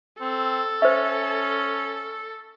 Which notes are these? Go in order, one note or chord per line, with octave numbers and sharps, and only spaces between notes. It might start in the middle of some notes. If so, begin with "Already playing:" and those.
C4 A4
C#4 C5 E5